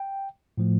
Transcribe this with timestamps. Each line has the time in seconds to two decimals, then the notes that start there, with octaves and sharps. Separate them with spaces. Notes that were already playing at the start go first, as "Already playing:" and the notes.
Already playing: G5
0.57 A2 F3 A3